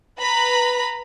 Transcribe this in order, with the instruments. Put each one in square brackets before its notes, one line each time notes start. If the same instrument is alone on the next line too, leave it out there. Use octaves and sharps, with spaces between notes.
[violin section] B4 A#5 B5